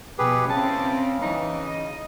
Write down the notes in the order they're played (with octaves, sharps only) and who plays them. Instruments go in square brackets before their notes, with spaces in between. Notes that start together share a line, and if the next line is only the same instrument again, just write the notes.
[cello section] B2 F3 [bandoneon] G4 G#4 B4
[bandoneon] C#3 [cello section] C4 C#4 E4 [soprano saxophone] A5
[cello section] E3 [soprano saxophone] D#4
[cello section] D#5